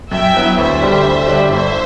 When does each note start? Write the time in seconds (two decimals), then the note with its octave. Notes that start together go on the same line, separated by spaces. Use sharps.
0.11 F#2 E5 G5
0.34 F#3 B3 E4
0.58 D2 C5 E5
0.81 D3 G3 D4 G4
1.03 D2
1.26 D3 G3 D4 G4
1.49 G1 C5 E5